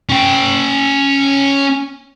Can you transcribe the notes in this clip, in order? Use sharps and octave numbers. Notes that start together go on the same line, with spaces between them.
C#4 G5